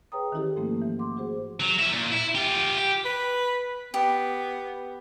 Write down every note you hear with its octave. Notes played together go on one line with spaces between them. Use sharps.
G#4 B4 C#5 G5 A#5 D#6
D#3 E3 C#4 E4 G4 A4
G#2 F3 A3 A#3 C#4
E3
F#5 C6 D6
F#4 G#4 C5
F#3
C#4 E4
A#2
E4
F4 G4
G4
B4
B3 G4